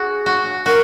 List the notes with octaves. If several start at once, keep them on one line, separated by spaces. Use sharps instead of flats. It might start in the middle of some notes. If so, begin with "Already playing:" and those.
Already playing: F#4 G#4
F#4
F#4 A#4